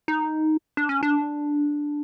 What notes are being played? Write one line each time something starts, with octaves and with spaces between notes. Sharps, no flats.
D#4
D4
C#4
D4